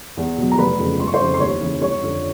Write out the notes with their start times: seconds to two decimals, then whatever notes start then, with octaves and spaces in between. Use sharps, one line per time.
0.17 E2
0.38 B2 F#3
0.51 A#5
0.58 F1 B4 B5
0.79 F2 C#3 F3
0.99 G1 C6
1.07 C#6
1.14 C5 C6
1.20 F2 C#3 F3
1.34 C6
1.40 D#2 C#5 C#6
1.61 C#3 E3
1.81 G1 C#5 C#6
2.02 F2 D3 F3